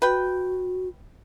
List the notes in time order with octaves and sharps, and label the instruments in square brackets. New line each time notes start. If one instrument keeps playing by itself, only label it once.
[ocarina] F#4 [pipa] B4 G5